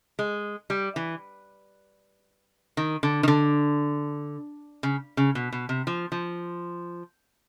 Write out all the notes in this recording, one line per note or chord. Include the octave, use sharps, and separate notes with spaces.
G#3
G3
E3
D#3
D3
D#3
D3
C#3
C#3
B2
B2
C3
F3
F3